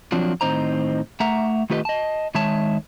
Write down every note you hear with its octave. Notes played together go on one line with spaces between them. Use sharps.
F3 F#3 C4 D4 F4
A2 D#3 C4 D#4 C5 A#5
A3 E5 F#5 A#5
D#3 A3 F4 G4 B4 D#5
D#5 A5
D#3 G#3 C#5 E5 A5